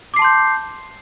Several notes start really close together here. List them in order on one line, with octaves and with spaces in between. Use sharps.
D6 C7 A5 C6 G6